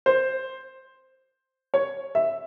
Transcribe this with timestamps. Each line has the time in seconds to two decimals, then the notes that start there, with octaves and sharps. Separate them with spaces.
0.06 C5
1.74 C#5
2.15 E5